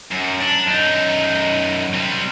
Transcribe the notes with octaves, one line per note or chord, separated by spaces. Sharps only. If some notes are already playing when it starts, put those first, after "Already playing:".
F#2
D4
F#2 D#4
G3 C4